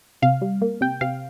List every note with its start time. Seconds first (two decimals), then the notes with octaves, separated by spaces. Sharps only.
0.22 C3 F5
0.42 G3
0.62 A#3
0.81 C3 G5
1.01 C3 F5